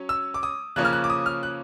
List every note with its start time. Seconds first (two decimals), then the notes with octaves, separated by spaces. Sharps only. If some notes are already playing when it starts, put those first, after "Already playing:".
Already playing: F#3 C#4
0.09 E6
0.34 D6
0.43 D#6
0.76 C#3 F3 A#3 C#4 F#6
0.85 F6
0.93 F#6
1.04 D6
1.10 D#6
1.26 F6
1.43 F#6